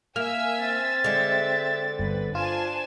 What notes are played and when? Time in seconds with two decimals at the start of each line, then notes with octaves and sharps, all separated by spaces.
0.16 A#3 E5 G#5 E6 F6
0.60 C4 A6
1.04 D3 G#3 E5
1.99 G1 B4
2.35 D4 F4 C5 G#5 A5 E7